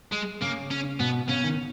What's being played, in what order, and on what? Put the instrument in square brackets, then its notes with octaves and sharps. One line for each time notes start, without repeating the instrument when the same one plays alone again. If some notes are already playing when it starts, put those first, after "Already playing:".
[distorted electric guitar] G#3
[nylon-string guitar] C#3 [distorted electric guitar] A#3
[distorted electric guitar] C#4
[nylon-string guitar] B2 [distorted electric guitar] B3
[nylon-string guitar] C#3 [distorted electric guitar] C#4
[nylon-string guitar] D#3